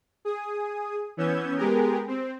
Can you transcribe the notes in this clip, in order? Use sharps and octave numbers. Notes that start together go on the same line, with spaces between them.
G#4 D#6
E3 B3 C#4 E6 G6 G#6
G#3 B3 G4 G#4 A#4
C4